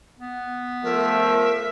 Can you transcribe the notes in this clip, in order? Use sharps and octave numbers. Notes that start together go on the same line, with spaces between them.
B3
F3 A3 A#4 E5